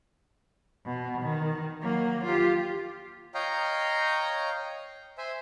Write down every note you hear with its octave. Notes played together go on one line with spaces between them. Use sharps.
B2
D#3
F#3 A#3
F4 G4
C#5 D#5 F5 G5 A#5
C5 E5 G#5